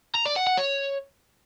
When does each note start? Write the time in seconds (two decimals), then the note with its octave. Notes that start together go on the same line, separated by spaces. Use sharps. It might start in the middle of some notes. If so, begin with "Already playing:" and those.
0.15 A#5
0.26 D5
0.36 F#5
0.47 F#5
0.57 C#5